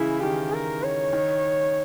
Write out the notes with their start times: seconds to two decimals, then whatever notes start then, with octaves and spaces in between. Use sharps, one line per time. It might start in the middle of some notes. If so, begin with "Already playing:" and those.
Already playing: C#3 E3 G#3 E4
0.23 D#3 G4
0.53 A#4
0.83 C#5
1.13 D#3